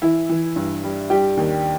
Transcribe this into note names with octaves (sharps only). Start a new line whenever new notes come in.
E3 E4
E3
G2
G3
G3 G4
D#2